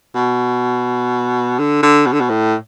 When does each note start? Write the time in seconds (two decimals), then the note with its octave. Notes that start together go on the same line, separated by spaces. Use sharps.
0.15 B2
1.59 D3
1.83 D3
2.06 B2
2.13 D3
2.21 B2
2.30 A2